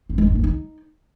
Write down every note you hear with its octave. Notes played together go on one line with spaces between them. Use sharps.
C4
G#3
D4
A#3
D#4